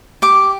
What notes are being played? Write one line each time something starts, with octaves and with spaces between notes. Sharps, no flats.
G4 D6